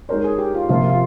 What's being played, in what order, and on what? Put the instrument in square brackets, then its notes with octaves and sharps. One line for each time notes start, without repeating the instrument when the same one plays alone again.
[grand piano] G#3 D#4 A#4 C#5 [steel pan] C5
[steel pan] G#4
G4
F4
[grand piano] C3 F3 A#3 [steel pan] F4
[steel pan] F4